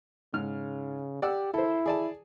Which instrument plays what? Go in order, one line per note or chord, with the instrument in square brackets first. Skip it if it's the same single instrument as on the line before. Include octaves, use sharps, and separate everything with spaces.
[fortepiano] G#2 F6 [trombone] C#3
[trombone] G4 [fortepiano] D5 F#5 E6
[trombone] E4 [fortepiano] A4 C5
[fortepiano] G#4 D5 A5